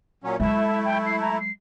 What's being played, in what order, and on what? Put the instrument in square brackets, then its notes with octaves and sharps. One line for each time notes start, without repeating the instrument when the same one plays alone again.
[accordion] A#2 F#3 C#4
[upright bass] F#3 G#3 [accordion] A3 E4 [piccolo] E5
[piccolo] G5
C7
A#5
C7